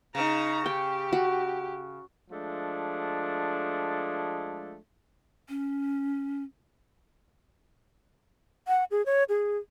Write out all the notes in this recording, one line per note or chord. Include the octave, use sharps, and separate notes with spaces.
C#3 D#4 A#5
G4 G5
F#4
F3 G#3 A3 D4
C#4
F#5
G#4
C#5
G#4